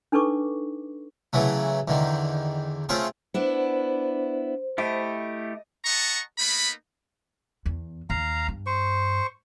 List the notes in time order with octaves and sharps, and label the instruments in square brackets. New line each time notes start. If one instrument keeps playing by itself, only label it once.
[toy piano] D4 D#4 A4 B4 C#6 D6
[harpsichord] C#3 E3 F#3 A3
E2 D3 D#3
A3 C4 C#4 F4 G#4
[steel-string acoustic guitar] B3 D4 E4 [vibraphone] C5
[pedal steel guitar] A3 E4 G4 [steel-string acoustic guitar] D#5
[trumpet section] D#5 F#5 A5 A#5 C#6
A#3 B3 D#4 B5
[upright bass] E2
[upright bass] D#2 [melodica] F5 A#5
[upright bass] G2
[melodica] C5 C#6